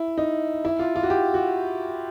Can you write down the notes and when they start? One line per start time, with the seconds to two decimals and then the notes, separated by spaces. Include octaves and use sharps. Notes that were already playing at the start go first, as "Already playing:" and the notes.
Already playing: E4
0.18 D#4
0.65 E4
0.79 F4
0.96 F4
1.03 F#4
1.10 G4
1.34 F#4